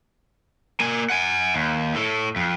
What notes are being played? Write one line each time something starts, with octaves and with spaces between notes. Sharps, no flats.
A#3 G#5
F#5 G#5
D#2
A2 A4
F2